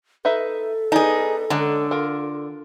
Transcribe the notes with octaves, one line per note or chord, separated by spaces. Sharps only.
D#4 A4 B4 E5
B3 D4 D#4 G#4 A5
D3 G#3 C#4 A#5
F4 A#4